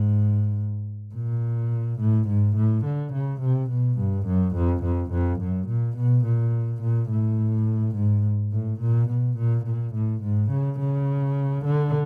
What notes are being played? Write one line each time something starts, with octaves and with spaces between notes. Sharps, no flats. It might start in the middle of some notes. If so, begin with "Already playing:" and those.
Already playing: G#2
A#2
A2
G#2
A2
D3
C#3
C3
B2
G2
F#2
F2
F2
F2
F#2
A#2
B2
A#2
A#2
A2
G#2
A2
A#2
B2
A#2
A#2
A2
G#2
C#3
C#3
D3